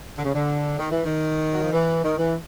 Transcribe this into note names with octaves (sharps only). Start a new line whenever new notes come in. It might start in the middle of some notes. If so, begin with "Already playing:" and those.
D3
C#3
D3
D#3
E3
D#3
F#3
F3
E3
D#3
E3